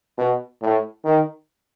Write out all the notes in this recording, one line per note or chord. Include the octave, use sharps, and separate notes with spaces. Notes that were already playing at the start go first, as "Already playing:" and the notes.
B2
A2
D#3